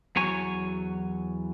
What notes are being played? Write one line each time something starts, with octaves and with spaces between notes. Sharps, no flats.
E2 F#3 C#5 G#5